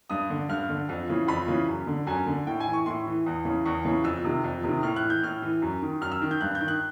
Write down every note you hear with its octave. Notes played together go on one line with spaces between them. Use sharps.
G2 D#6
D3
G2 F6
D3
F2
C#3 E3
F2 B5
C#3 E3
F#2
D3
F#2 G#5
D3
A2 G5
G#5
E3
C#6
A2 C6
E3
E2
C#3 E3
E2 C#6
C#3 E3
F2 E6
C3 D#3
F2
C3 D#3
A2 F6
F#6
E3
G6
A2 F6
E3
F#2
D#3
F#2 F6
E6
D#3
G6
G2 F#6
G6
D#3
F#6